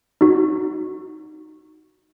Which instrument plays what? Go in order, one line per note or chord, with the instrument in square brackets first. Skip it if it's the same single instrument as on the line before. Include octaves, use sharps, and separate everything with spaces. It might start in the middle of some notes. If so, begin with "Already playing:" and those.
[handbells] D#4 F#4